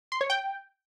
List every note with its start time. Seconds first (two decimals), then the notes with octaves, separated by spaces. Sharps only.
0.12 C6
0.21 C#5
0.30 G5